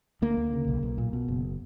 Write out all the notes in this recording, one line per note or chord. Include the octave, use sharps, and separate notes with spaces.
D2 A#3
D2
C#3
B1
B1
A#2
B2
F#1